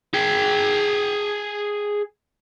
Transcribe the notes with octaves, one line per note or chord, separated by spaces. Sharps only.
G#4 G5